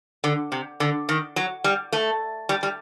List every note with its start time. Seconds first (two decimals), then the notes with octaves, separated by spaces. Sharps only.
0.24 D3
0.52 C3
0.80 D3
1.09 D#3
1.36 F#3
1.64 G3
1.93 A3
2.49 G3
2.63 G3